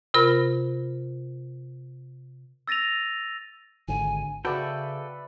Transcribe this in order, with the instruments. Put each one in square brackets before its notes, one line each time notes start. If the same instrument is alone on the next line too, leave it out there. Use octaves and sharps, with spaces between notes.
[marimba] C3 F4 A#4 B5
[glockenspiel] E6 A6 A#6 D#7 F7
[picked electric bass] G#1 D3 [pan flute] G#5
[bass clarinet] C#3 [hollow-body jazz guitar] F#4 [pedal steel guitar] A4 G5 [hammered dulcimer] B4 D5 E5